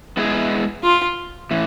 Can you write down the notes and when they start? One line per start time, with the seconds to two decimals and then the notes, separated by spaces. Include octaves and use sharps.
0.17 G#3 B3 E4 G#4
0.83 F4
1.51 A2 E3